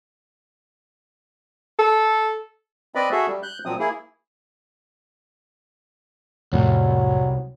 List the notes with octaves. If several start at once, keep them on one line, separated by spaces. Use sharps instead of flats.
A4
C4 B4 D5 D#5 B5
F#4 G#4 A4 E5
G3
F#6 G6
A#2 F3 F#3 C4 D#6
A#3 E4 G#4
C2 F2 A2 F#3